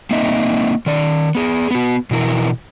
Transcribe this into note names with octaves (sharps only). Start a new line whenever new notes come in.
A#3 C4 D#4 D#5 E5
D#3 D5
B3 G#4
B3 F#4
B2 E3 E4 A#4